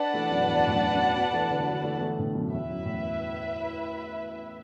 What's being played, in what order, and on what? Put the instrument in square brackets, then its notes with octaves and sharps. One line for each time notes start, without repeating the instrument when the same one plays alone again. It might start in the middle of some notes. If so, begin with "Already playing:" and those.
Already playing: [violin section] D4 B4 D5 F#5 A5
[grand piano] E3 A3
F#2 B2
E2 A2
A2
F#2
F#2 B2
F#3 B3
E3 A3
D3 F#3
A3
D3 F#3
E3 A3
B3
E3 A3
A2 D3
F#2 B2
[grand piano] E2 [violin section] E4 B4 E5
[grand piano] F#2
E2 A2